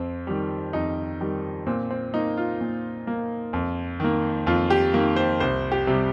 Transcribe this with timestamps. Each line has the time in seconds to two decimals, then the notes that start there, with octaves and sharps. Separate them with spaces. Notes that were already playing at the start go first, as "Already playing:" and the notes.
Already playing: F2 C4
0.27 D#3 G3
0.73 F2 D#4
1.21 D#3 G3
1.66 A#2 C4
1.91 C4
2.14 A#3 D#4
2.37 F4
2.61 A#2
3.07 A#3
3.53 F2
4.00 D#3 A#3
4.47 F2 F4
4.70 G4
4.94 D#3 A#3
5.16 C5
5.40 C2 C5
5.72 G4
5.87 C3 G3